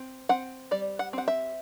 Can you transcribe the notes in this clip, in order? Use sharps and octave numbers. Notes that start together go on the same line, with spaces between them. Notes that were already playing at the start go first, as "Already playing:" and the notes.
Already playing: C4
C4 F#5
G3 D5
F#5
C4 F#5
E5